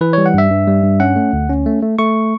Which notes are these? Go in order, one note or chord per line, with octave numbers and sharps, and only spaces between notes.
E3 B4
G3 C#5
F#5
G2 E5
G2
G3
G2
C#4 F#5
A3
D2
C#4
A3
A3
A3 C#6